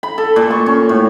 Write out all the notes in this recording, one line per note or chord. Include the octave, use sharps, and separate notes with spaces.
B5
A4
A#2
C#6
C#4
A2